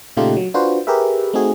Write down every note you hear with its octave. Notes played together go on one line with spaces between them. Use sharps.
A#2 C#3 A3 D#4 F4 G4
F#3
D4 F4 F#4 B4 C5
G4 G#4 A#4 B4 E5
A3 C4 D#4 F#4 G#4